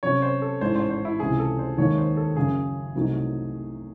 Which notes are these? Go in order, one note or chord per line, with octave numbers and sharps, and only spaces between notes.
C3 F#3 C#4 F#4 C#5
C5
A4
A1 G#2 E3 G#3 C5
C5
C5
E4
C#2 C3 E3 G#4
A4
C5
D#2 D#3 G#3 C4 C#5
C5
A4
F#1 F#2 C#3 G#4
C2 C3 F#3 A3 D#4